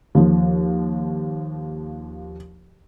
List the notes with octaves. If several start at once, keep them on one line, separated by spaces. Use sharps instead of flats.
D#2 F3